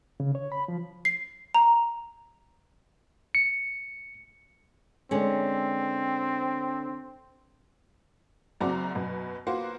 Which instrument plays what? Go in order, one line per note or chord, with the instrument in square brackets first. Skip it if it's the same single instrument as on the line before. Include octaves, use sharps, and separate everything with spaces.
[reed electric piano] C#3
C#5
B5
F3
[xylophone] C7
A#5
[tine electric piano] C#7
[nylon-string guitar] D3 G#3 C#4 [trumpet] C4
[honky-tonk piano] F#1 F#2 C4 F#4 D5 A#5
F#2 B2
A#3 B3 F4 F#4 C5